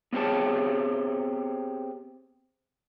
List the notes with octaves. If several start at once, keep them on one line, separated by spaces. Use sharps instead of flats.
B3 C4 G4 G#4 C#5 A5